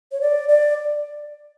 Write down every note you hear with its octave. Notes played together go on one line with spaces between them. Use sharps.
C#5
D5
D5